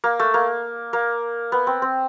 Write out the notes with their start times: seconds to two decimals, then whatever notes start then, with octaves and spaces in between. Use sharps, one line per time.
0.04 A#3
0.20 A3
0.34 A#3
0.93 A#3
1.52 B3
1.67 C4
1.82 C4